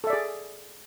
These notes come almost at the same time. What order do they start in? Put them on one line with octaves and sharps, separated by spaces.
A4 E5 D5 G#4